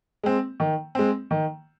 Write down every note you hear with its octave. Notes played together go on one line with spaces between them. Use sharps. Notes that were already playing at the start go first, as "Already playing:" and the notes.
G#3 C4
D#3
G#3 C4
D#3